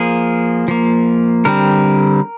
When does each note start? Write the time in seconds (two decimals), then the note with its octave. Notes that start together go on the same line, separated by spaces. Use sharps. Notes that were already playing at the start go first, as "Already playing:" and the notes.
Already playing: F3 A#3 G#4
0.68 F3 A#3
1.45 D3 G3 C4 A#4